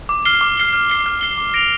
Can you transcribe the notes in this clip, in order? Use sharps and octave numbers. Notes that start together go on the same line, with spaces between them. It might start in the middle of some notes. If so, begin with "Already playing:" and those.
D6
F6 C7 G7
D6
F6 C7 G7
F6
C7 G7
F6
C7 G7
D6
A#6 D7 F7